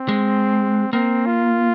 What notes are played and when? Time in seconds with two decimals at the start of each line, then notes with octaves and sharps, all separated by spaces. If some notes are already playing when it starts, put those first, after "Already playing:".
Already playing: C4
0.09 G#3
0.93 A#3 C4
1.26 F4